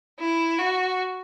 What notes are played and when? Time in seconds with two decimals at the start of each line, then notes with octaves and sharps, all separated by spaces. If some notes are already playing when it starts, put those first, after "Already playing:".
0.20 E4
0.59 F#4